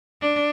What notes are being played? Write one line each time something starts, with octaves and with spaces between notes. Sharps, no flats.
D4